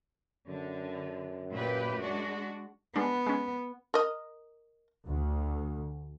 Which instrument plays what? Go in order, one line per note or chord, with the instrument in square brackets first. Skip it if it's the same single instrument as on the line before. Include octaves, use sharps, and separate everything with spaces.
[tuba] F#2 [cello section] D3
[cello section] A#2 G4 B4
G#3 D4 F#4
[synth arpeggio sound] G3 G#3 D4 [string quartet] B3
[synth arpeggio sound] G#3 C#4
[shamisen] A#4 D#5
[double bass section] D2